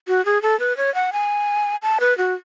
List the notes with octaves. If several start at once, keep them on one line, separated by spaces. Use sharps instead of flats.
F#4
G#4
A4
B4
C#5
F#5
G#5
A5
B4
F#4